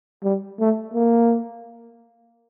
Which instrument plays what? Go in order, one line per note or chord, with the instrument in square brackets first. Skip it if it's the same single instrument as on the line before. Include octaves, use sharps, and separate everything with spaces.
[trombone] G3
A3
A#3